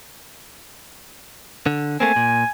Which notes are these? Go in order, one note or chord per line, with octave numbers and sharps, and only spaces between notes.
D3
A3 A#3 C4 G#5
A#2